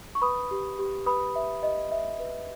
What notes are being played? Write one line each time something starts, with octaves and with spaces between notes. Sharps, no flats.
C#6
B4 B5 D#6
G4
G4
B4 B5 D#6
B4 E5
G4 D#5
G4 E5
B4